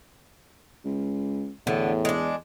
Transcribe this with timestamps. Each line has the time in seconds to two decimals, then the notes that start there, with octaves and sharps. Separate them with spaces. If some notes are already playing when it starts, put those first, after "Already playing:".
0.85 C#2
1.67 E2 A2 D3 B3
2.05 G#3 D4